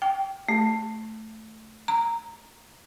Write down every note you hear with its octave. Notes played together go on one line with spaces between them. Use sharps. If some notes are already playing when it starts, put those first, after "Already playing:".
G5
A3
A#5